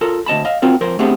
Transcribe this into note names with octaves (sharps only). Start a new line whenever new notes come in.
F4 A4 A#4
D2 D#5 A5 B5
D#5 F5
C4 F4 F#4 A#4
F2 A#4 C5
A3 B3 C4 D4 G4 G#4